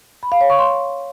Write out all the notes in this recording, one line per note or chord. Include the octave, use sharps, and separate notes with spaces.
B5
F5
C#5
C#6
C6